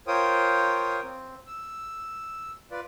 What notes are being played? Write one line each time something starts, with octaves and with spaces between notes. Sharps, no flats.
F4 A#4 C5 C#5 G5 D#6
C4
E6
F4 B4 D5